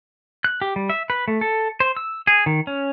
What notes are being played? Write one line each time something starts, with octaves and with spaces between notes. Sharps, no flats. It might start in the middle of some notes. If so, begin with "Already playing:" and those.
F#6
G4
G3
E5
B4
A3
A4
C5
E6
G#4
D#3
C#4